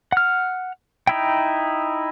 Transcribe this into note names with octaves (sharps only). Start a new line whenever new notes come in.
F#5 F6
D#4 E4 G5